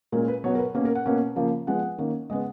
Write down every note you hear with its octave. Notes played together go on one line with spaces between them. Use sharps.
A#2 G#3 C#4 A#4
B4
B2 F#3 B3 C#5
A#4
B4
B2 A#3 C#4 A#4
A#4
F#5
B2 A#3 C#4
C#3 F3 A#3
F3 G#3 B3 F#5
D#3 A#3 C#4
C#3 G#3 B3 D#5